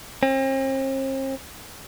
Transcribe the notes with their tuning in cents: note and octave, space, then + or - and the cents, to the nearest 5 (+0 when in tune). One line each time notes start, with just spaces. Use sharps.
C4 +45